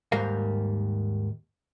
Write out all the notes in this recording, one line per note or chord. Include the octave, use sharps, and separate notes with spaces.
D#2 G#2 G3 A#4 F5